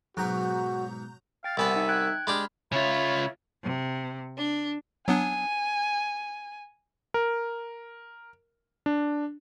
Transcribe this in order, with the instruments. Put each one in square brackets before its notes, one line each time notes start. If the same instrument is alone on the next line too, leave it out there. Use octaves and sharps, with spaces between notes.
[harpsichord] G#2 B2 [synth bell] F#3 A#5 G6 [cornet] F#4
[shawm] F5 [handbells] G5 A6
[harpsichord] C2 B3 B4 [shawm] E5 [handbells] F#5 G#5
[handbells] D#4
G5 F#6 G#6
[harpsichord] G#3 D4 G4 [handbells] B5 F6
[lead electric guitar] C#3 F4 [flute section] C#5 E5 B5
[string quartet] C3
D4
[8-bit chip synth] F#3 B3 D4 [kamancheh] G#5
[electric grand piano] A#4
D4